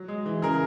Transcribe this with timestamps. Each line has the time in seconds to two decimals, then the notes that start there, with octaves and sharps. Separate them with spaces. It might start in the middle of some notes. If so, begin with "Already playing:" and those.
Already playing: F#3
0.08 G#3
0.26 E3
0.42 C#3 G#4 A#4